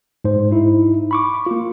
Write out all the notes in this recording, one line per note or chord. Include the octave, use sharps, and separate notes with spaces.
G#2 C5
D#4 E4
B5 C#6 D6
A#3 F4